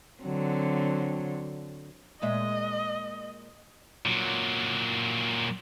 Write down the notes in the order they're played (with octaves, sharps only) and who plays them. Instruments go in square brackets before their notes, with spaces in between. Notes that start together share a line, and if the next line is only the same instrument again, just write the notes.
[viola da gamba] D3 F#3 C4
[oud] A#2 G#3 E5 [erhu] D#5
[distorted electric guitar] A#2 F#3